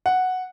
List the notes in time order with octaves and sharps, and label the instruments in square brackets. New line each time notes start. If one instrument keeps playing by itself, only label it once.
[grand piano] F#5